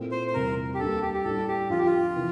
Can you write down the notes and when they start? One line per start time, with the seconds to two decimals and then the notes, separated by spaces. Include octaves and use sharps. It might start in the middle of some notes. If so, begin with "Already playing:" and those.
Already playing: A#2 A3 C4 E4
0.12 C5
0.28 C5
0.34 E2 C3 G3 A#4
0.74 G4
0.79 D2 D3 G3 A#3 D4 A4
1.02 G4
1.14 G4
1.24 A2 G3 D4 A4
1.48 G4
1.69 F2 D3 F3 F4
1.78 G4
1.86 F4
2.16 C3 E3